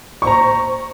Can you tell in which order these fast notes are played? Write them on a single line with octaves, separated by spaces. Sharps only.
C#6 C5 A#5